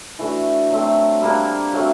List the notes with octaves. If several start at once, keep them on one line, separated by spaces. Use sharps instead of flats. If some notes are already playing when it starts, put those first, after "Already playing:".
E3 A3 D4 F#4
F#3 A3 C4
G3 A#3 D4
F#3 A3 C4